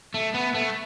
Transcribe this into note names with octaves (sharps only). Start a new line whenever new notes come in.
A3
B3
A3